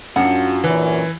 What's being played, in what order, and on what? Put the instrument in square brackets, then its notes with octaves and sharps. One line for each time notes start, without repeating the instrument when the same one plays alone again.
[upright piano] F#2 [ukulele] D4 F#5 [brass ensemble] F4 F#4
[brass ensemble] F#2 A#2 [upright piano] E3